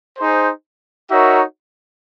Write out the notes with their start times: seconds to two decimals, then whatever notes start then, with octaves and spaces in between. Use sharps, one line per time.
0.17 D#4 G#4 C5
1.10 D#4 F#4 A#4 C#5 E5